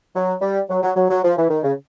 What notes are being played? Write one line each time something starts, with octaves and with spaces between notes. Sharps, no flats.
F#3
G3
F#3
F#3
F#3
F#3
F3
E3
D#3
C#3